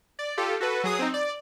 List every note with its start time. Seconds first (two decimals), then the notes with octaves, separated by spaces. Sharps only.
0.19 D5
0.37 F4 G4 A4
0.60 F#4 A4 B4
0.84 F#3 G#4 D#6
0.99 C4 D#4
1.14 D5